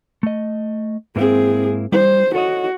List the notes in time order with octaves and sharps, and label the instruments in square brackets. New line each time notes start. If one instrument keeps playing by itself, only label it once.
[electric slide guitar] A3 D#5
[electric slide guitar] G#2 A#3 E4 [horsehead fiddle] C4 G#4
[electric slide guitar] G3 [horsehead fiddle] C5
[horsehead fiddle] F#4 [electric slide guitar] A4 C#5 D#5